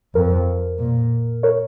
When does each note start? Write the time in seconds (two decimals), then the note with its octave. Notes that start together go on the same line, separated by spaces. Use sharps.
0.15 F2 A#4
0.79 A#2
1.43 A#4 C#5